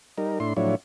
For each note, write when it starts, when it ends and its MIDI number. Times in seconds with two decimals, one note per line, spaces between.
0.18 0.39 55
0.18 0.39 63
0.18 0.39 70
0.40 0.53 45
0.40 0.53 62
0.40 0.53 64
0.40 0.53 84
0.57 0.75 45
0.57 0.75 53
0.57 0.75 54
0.57 0.75 62
0.57 0.75 64
0.57 0.75 73